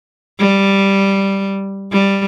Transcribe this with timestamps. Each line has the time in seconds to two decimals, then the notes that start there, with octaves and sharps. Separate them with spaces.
0.39 G3
1.92 G3